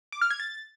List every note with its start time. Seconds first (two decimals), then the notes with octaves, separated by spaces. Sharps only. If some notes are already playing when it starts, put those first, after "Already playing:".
0.12 D6
0.21 F6
0.31 G#6
0.40 A6